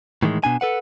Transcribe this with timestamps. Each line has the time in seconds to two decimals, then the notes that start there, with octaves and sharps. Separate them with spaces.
0.23 A2 D#3 E3 G#3
0.44 B2 D4 G#5
0.61 A4 B4 F#5